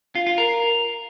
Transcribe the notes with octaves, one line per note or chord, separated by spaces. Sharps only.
F4
F4
A#4